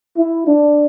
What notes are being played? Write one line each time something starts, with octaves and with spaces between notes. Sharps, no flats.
E4
D4